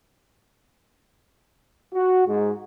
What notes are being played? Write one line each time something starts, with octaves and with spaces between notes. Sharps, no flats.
F#4
G#2